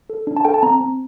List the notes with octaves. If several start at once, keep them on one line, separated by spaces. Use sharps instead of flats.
A4
D4
A5
A4 G5
A5
C4 A#5
C4